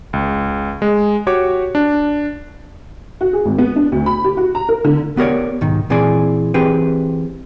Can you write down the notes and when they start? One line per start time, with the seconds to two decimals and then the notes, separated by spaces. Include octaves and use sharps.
0.13 C#2
0.82 G#3
1.27 F#4 G4 C#5 C#6 D6
1.75 D4
3.21 F#4
3.33 G#4
3.45 G#1
3.58 B3
3.76 D4
3.92 D2
4.06 B5
4.24 G4
4.37 F#4
4.55 A#5
4.69 A#4
4.85 D3
5.17 B3 G4 A#4 C#5 D5
5.61 B1 G#2 D#3
5.90 A#2 E3 C4 G#4 D5 G#5
6.54 E3 C4 G4 G#4 B4